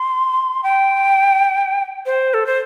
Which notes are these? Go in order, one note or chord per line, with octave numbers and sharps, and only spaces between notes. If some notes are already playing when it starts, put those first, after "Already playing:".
Already playing: C6
G5
C5
A4
C5